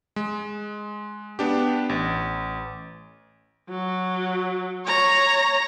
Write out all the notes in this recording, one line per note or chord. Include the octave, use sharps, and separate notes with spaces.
G#3
B3 D4 G4
A1
F#3
C#5 A#5